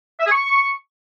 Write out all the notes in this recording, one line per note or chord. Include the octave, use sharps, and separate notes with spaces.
E5
G#4
C#6